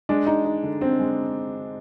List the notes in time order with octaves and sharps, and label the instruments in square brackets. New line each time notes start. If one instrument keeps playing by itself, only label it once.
[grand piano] G#3 [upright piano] D4
[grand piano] D#4
D#4
D3
[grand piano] D3 [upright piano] C4
[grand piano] G#3